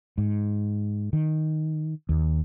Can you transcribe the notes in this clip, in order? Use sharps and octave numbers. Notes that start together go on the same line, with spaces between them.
G#2
D#3
D#2